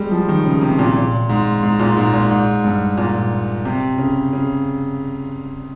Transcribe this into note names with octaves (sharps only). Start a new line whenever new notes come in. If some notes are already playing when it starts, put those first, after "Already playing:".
Already playing: G3 G#3
F3
D#3
C#3
C3
A#2
A#2
G#2
G#2
A#2
G#2
A#2
G#2
G2
A#2
C3
C#3
C#3